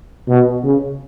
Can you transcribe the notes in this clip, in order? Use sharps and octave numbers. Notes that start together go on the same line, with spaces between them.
B2
C#3